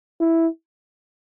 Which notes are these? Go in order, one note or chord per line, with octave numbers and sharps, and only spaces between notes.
E4